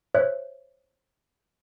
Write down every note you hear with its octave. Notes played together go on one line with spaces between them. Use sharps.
C5 C#5 E5 F#6